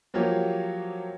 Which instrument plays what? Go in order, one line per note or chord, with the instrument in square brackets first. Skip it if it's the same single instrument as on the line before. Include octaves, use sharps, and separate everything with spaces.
[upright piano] F3 F#3 A#3 F4 G4 C#5